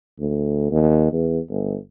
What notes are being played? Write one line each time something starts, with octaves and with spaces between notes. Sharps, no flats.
D2
D#2
E2
G1